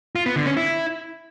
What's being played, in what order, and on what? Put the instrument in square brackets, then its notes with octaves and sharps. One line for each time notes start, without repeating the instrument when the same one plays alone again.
[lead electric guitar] F4
B3
D3
C#4
E4